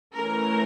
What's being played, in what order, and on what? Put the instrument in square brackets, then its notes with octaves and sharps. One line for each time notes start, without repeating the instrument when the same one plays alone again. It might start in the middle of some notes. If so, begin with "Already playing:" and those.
[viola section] E3 A3 C#4 A#4